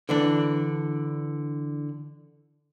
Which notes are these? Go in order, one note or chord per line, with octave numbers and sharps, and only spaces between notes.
D3 E3 D4